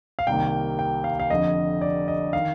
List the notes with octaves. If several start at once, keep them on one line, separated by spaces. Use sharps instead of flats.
F5
C2 C3 D#3 A#3 G5
G5
F5
F5
F1 F2 D3 D#5
D5
D#5
D#3 F5